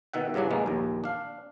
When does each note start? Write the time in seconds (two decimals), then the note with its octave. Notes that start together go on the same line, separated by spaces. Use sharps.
0.13 B2 D#3 E5 F#5
0.34 G2 C#3 E3 F#3 D4
0.50 B1 B2 G#3 A#3
0.66 A#1 D#2
1.04 D4 F5